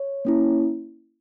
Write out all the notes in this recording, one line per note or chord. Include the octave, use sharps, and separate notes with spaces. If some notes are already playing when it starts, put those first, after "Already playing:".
Already playing: C#5
A#3 C#4 E4